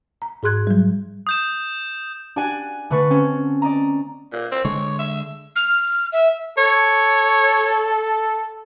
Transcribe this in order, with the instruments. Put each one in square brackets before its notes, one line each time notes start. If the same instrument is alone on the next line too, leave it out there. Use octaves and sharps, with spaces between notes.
[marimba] A#5
G#2 G#4 C6 F#6 G#6
F#3 G3
[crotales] D#6 G6 E7
[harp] D4 G4 D5 F#5 G#5 F#6
D3 A3 B4 C#6 A6 C#7
C4 C#4
D5 D#5 A#5
[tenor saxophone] A#2
C4
[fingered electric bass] D3 G#3 [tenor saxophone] C#5
[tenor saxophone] E5
[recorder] F6
E5
[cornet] A4 [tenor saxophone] C#5